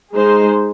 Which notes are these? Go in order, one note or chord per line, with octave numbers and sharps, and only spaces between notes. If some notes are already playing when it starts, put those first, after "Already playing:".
G#3 D#4 G#4 C5